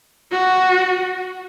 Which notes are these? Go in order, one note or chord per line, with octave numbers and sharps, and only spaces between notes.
F#4